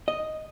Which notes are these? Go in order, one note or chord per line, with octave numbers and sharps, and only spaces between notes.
D#5